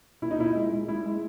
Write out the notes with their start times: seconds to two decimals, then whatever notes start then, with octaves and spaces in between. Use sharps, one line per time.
0.22 A#2 E4
0.31 D#4
0.39 A#2 E4
0.56 G#3
0.72 G#3
0.88 G#3 E4
1.06 G#3